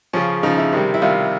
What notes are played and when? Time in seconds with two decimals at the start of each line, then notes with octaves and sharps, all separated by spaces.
0.13 C#3 F3 C#4
0.43 C#3 D#4
0.46 F3
0.58 E4
0.73 C3 D#3 G3
0.94 E4
1.02 C3 D#3 G3 F4